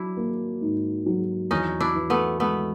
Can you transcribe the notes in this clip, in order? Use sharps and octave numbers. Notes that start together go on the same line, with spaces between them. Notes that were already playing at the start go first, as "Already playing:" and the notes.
Already playing: F#3 D4 E4
A#3
G#2
F#3
E2 C#4 D#4
D4 E4
E3
A3 B3
G#3 A3 B3